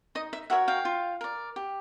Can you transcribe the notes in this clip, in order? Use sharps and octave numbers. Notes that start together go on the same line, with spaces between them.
D#4 D#5
E5
F#4 A#4 C#5 E5 F#5
F5 G5
F4
A#4 D5
G4